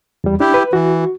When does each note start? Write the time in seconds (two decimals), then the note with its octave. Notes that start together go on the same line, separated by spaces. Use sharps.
0.24 E2 G3
0.40 D4 E4 G4
0.54 B4
0.73 E3 F#4